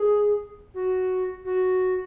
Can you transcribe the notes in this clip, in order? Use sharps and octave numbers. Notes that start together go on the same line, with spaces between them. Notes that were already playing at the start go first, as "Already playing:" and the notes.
Already playing: G#4
F#4
F#4